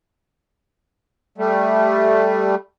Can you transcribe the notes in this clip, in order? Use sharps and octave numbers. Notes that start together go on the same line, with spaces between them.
G3 A3